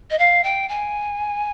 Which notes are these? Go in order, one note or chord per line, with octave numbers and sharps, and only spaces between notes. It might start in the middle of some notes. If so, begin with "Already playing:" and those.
D#5
F5
G5
G#5